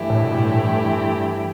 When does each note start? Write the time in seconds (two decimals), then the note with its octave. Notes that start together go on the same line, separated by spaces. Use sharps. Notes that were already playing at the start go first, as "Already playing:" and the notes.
Already playing: G2 E3 A3 E4 G4
0.10 A2
0.23 B2
0.37 A2